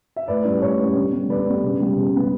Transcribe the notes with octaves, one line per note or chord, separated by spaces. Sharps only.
E5
A2 B4 D5
G3 C#4 E4
A2 C#5
G3 C#4 E4
D3
G3 B3
D3 B4 D5
G3 B3
C#3
G3 B3
C#3
G3 B3